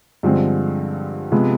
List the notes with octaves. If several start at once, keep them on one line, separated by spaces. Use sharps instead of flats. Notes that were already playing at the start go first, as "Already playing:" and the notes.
G2 D3 F3 G#3 C4
C3 F3 G#3 B3